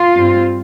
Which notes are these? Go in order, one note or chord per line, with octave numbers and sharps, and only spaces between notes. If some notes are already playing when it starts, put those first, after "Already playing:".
Already playing: F4
G2 G3 C4